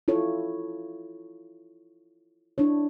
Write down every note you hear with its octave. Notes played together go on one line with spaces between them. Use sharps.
E4 F4 A4 C#5
D4 E4 C#5